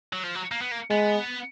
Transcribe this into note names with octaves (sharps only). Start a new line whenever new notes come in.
F#3
F3
F#3
A#3
B3
A#3
G#3 B3